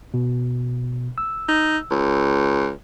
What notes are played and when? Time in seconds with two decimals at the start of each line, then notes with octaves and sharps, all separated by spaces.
0.14 B2
1.18 E6
1.48 D#4
1.91 C#2